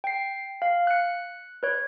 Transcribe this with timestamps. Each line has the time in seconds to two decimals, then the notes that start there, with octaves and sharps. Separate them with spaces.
0.04 G5 C7
0.62 F5
0.87 F#6 C#7
1.63 B4 C#5